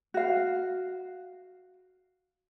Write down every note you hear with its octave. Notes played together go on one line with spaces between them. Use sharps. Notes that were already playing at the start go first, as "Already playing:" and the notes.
F#4 F5